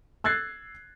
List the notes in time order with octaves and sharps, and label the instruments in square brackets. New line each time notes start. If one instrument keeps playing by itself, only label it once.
[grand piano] E6 F#6 G#6 A6 C7